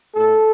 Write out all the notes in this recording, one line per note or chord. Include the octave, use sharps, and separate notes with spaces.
A2 A3 A4